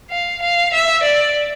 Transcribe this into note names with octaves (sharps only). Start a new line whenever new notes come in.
F5
F5
E5
D5